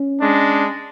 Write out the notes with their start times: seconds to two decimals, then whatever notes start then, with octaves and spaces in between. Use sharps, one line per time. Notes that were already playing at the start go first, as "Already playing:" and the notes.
Already playing: C#4
0.20 G#3 D4